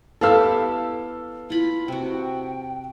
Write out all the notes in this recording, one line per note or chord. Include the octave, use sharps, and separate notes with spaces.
B3 E4 G4 A4 F5 E6
E4 F4 B5
C3 F#4 G5